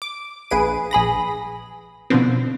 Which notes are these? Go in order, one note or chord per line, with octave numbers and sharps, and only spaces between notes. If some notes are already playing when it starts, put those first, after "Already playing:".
D6
A#1 G#4 B4 D7 D#7
A#1 G#4 B5 A#6
B2 D3 F3 B3 C4